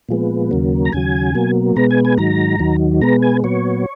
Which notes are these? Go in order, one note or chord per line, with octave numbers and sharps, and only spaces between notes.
A#2 F3 G#3 B3
D#2 C#3 F#3 A#3
A#5
D#2 C#3 F#3 G#5
B2 F#3 A#3
B2 G#3 B3 A#5
G#5
G#5
G#2 D#3 F#3 A#5
D#2 D#3 F#3
B2 G#3 B3 A#5
G#5
A#2 F#3 B3 C#5